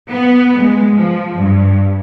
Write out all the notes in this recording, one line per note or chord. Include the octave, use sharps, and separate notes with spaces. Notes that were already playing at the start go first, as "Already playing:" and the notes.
B3
G#3
F3
G2